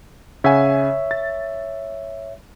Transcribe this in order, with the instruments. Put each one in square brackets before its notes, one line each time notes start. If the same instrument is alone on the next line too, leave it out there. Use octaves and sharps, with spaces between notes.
[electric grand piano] C#3 F#5 G#5 [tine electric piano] C#5 E5
[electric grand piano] A6